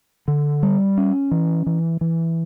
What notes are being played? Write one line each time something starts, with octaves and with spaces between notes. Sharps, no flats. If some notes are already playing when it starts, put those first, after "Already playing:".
D3
G3
C#4
E3
E3
E3